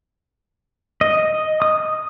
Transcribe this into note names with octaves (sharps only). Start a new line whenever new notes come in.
D#5
D#6